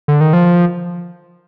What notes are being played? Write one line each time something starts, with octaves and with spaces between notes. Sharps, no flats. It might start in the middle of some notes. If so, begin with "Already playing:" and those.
D3
D#3
F3